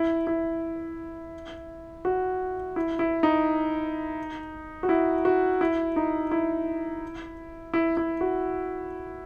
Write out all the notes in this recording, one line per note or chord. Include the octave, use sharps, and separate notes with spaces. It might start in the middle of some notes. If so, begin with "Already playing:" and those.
Already playing: E4
E4
F#4
E4
E4
D#4
F#4
E4
F#4
E4
D#4
E4
E4
E4
F#4